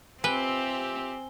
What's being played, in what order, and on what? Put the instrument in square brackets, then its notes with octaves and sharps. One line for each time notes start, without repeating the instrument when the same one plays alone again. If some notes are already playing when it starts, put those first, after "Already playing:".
[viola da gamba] C4 [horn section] F4 G4 E5 [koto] B4 [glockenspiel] G#5 G7